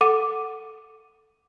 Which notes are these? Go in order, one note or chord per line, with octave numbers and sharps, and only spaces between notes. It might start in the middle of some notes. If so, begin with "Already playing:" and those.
A4 F#5 D6 D#7